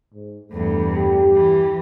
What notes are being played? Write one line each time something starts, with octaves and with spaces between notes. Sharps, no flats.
G#2
E2 G2 A3
G4
E3